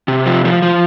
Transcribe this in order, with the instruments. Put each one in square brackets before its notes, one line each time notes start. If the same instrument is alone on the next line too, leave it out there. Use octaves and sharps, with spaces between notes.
[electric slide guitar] C3
F3
F3
F3